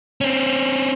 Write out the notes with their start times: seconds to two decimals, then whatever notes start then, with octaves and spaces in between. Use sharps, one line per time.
0.21 C4 C#4